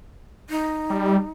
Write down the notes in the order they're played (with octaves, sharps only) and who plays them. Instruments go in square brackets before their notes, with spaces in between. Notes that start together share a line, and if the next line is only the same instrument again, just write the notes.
[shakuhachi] D#4
[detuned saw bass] G3